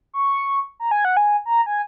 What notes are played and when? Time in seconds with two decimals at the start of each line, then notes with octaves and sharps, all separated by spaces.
0.13 C#6
0.80 A#5
0.91 G#5
1.05 F#5
1.17 G#5
1.46 A#5
1.66 G#5